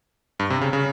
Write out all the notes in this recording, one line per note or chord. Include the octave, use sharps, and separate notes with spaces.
G2
C3
C#3
C#3